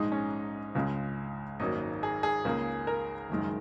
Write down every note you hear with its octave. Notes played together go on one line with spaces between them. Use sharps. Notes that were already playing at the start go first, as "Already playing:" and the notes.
Already playing: A#1 G#2 G#3 D#4
C#4
C#2 C#3 G#3
G#1 F#2 F#3 A#3 D#4
G#4
G#4
C#2 C#3 A#3
A#4
F#1 F#2 D#3 G#3